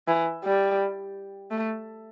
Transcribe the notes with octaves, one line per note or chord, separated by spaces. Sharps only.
E3
G3
A3